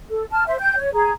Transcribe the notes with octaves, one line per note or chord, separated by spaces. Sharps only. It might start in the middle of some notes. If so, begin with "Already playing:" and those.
A4
A5 F6
C5 E5
G5 G6
C#5
G#4 A#5